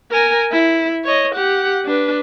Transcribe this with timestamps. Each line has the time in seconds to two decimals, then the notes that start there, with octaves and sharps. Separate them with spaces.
0.11 A#4 G#5
0.52 E4
1.04 C#5 D#5
1.34 G4 F#5
1.85 D4 B4